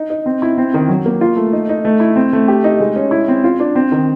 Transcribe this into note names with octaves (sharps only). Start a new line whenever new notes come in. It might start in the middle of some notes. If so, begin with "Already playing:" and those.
Already playing: D#4
D#4
C4
E4
C4
D#3
F#3
A#3
F4
A3
D#4
D#4
A3
E4
C4
A3
G4
D#4
G#3
C#4
E4
C4
F4
D4
C4
D#3